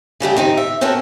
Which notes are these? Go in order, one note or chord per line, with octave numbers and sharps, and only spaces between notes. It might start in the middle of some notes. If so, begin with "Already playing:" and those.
C#3 G3 A3 G4
D#3 C4 D#4
E5
C4 C#4 F#4 A4 A#4